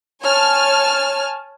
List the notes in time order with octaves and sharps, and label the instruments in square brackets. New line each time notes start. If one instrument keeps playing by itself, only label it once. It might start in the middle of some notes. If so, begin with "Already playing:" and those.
[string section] C#5 G#5 A5 F6